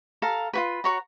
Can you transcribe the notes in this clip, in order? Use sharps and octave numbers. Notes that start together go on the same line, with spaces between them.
A4 F5 A#5
F4 F#4 B4
F#4 C#5 A#5